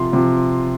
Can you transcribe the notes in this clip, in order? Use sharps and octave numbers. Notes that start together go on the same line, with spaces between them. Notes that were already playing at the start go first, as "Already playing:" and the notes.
Already playing: C3 F3 C6
C3 F3